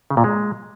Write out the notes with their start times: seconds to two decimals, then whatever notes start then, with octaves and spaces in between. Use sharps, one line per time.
0.10 C#3
0.17 A#2
0.24 G#3